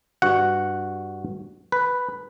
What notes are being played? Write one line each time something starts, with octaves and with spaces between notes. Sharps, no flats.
G2 F#4 F#5
B4